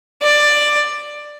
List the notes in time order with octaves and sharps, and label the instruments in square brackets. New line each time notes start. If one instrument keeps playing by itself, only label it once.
[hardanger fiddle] D5